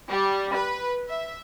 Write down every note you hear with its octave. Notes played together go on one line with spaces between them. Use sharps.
G3
B4
E5